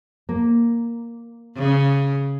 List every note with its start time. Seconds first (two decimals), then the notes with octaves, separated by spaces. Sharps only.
0.29 A#3
1.57 C#3